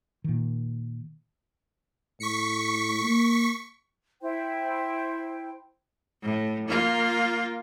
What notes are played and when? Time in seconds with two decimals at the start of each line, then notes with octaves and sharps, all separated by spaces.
0.24 A#2 D#3
2.20 A2 C#6 B6 C#7
3.04 A#3
4.21 E4 C5 G5
6.23 A2
6.68 A#3 F4